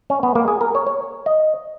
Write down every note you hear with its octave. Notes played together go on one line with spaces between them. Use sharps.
C#4
B3
A#3
G#4
A#4
C#5
C#5
D#5